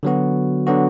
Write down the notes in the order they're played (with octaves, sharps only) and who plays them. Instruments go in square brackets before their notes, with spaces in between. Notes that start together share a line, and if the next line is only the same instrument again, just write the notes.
[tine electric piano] D3 F#3 B3 F#4
D3 F#3 B3 F#4